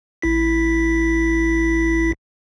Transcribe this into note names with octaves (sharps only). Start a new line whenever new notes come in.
A1 E4 B6